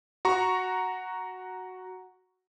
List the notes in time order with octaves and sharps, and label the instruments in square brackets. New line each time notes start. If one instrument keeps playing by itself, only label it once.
[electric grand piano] F#4 A#5 C#6